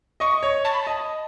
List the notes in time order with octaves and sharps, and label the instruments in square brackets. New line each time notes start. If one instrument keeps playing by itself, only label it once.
[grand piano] D#5 [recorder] C#6
[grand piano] C#5
[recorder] A5
B5
A5
[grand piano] D#5